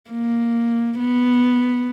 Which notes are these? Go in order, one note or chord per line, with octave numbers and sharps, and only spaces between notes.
A#3
B3